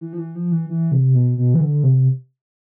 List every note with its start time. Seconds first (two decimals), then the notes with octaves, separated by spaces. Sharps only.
0.01 E3
0.13 F3
0.18 E3
0.35 F3
0.52 E3
0.69 E3
0.92 C3
1.15 B2
1.38 B2
1.54 E3
1.60 D3
1.83 C3